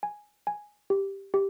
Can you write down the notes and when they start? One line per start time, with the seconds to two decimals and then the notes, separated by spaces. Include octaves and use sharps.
0.03 G#5
0.47 G#5
0.90 G4
1.34 G4